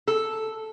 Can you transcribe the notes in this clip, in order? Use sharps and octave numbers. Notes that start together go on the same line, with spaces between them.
A4